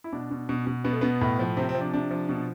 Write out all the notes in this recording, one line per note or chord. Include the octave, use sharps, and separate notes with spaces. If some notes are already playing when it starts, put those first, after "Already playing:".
E4
B2 D4
B2
B2
B2
B2 B3
A3
B2 B3
A2
F3
C3 C4
C4
F3
D4
C3 D4
F3
B2